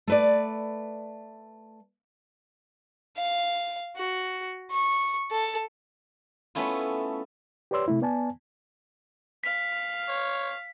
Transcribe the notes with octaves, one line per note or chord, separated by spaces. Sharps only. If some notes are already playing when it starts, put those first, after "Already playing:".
A3 B4 D5
F5
F#4
C#6
A4
A3 B3 C#4 E4 F4
G4 B4 C#5 D5 C6 E6
C3 A3 E4
B3 D5 G#5 A5
F5 F6 B6
C#5